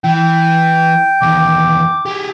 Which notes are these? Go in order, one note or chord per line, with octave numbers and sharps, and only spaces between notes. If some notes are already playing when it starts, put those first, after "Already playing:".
E3 G5
E2 D#3 D6
G4 G#4